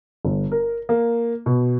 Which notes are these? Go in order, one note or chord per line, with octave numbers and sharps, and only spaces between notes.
G1
A#4
A#3
B2